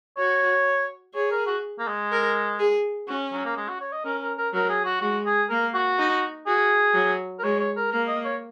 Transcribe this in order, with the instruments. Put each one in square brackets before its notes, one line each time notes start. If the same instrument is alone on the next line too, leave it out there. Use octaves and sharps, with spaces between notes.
[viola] F#4 [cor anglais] C#5
[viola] G#4 [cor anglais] C#5
[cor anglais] A#4
F#4
A#3
G#3
[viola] A#4
G#4
[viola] C#4 [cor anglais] F#4
[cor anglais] F#3
A#3
G#3
F#4
C#5
D#5
[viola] C#4 [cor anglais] A#4
[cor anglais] A#4
A#4
[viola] F#3 [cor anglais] A#4
[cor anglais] G#4
F#4
[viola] G#3 [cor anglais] F#4
[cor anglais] G#4
[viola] A#3 [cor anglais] A#4
[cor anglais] F#4
[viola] D#4
[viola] F#4 [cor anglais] G#4
[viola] F#3
[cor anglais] A#4
[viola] G#3 [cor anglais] C#5
[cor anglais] C#5
A#4
[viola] A#3 [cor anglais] A#4
[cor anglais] D#5
C#5